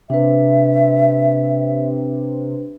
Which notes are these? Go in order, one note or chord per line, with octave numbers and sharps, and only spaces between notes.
C3 D4 B4 E5